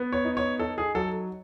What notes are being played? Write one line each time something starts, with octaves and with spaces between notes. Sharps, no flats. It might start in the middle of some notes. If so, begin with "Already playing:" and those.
Already playing: B3
C#5
D#4
C#5
D#4 A4
G#4
F#3 A4